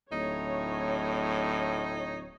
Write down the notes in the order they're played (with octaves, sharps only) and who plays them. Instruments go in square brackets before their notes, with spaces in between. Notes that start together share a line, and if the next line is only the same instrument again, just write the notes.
[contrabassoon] D1 [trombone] A2 [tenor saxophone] D#4 [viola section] C#5